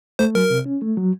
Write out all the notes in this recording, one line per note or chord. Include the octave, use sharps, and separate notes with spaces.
A3 C5
F#3 A#4
C3
C#4
A3
F#3